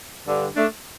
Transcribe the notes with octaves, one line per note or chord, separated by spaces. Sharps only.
G2 D3
A3 D4